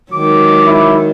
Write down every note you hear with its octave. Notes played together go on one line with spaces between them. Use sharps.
D#3 F#3 G#3 D6
E4